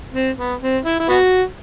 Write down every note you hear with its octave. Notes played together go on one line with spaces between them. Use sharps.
C4
B3
C4
E4
E4
B3 F#4